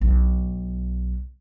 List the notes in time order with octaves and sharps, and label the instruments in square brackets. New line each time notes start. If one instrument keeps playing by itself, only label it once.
[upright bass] B1 D4